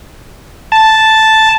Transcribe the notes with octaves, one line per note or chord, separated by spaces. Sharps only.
A5